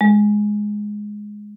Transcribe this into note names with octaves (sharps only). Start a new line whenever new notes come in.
G#3